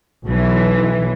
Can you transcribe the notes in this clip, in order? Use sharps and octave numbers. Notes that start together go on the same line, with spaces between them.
B1 E3